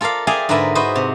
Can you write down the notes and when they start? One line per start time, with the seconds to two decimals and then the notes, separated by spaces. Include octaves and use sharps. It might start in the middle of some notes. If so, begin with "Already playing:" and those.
0.01 F4 A4 A#4 D5 F5
0.27 G#4 D5 E5 F5 G5 G#5
0.49 G#2 D3 A#4 B4 E5
0.75 E4 F#4 B4 C5 D#5
0.95 C3